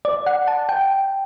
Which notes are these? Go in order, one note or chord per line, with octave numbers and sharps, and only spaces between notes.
D5
F#5
A5
G5